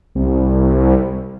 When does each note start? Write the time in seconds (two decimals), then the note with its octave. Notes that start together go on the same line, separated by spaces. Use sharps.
0.15 C2